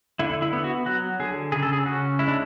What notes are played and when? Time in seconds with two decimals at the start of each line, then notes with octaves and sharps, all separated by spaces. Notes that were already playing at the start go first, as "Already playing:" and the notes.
0.19 D3 E4
0.42 E4
0.53 B3
0.64 F#4
0.86 F#3 F#4
1.20 D3 G#4
1.52 C#3 G#4
1.63 A4
1.73 G#4
1.86 C#4 F#4
2.19 G#3 E4
2.28 D4